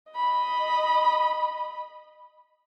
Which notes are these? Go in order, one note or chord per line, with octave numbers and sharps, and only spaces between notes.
D#5 B5